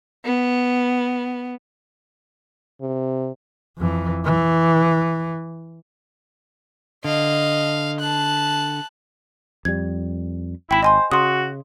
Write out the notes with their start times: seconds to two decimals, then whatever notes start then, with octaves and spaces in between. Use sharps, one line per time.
0.25 B3
2.81 C3
3.78 F2 E3
4.25 E3
7.04 D3 D#5 F5
8.00 A5 F#6
9.65 F2 G3 G#6
10.71 G#1 E4 G5 B5
10.83 C5 D#5 G#5 C6
11.12 C#3 F#4 C6 D#6